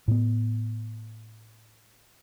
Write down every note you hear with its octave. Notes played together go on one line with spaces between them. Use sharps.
A2 B3